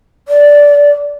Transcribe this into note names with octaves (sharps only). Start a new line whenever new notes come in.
D5